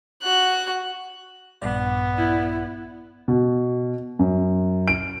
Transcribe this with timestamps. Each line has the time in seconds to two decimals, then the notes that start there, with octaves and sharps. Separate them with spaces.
0.23 F#4 F#6
1.62 A#1 G2 B3 D5
2.17 E4
3.28 B2
4.19 F#2
4.88 D7